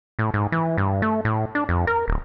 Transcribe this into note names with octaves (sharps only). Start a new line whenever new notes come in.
A2
G#2
E3
G2
A3
A2
D4
F2
A#4
D1